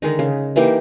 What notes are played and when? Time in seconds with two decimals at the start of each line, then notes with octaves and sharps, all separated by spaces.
0.02 D3 D#3 G#3 D#4
0.19 C#3
0.56 E3 A#3 D#4 G4